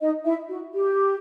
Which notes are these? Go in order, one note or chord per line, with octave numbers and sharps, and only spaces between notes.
D#4 D#5
E4 E5
F#4
G4